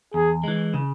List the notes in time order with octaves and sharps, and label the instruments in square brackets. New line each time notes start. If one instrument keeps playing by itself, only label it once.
[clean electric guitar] E2 [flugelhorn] G#4
[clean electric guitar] E3 G#3
C#3